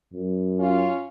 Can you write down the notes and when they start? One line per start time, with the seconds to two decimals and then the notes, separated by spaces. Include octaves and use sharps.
0.13 F#2
0.59 C#4 F4